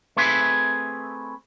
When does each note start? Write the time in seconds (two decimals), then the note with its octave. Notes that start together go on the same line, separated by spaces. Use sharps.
0.17 A3 C4 G#4 B4 E5